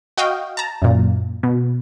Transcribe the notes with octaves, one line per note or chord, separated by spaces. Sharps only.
F#4 D#5 F5 G5
A5 A#5
F#2 A#2
B2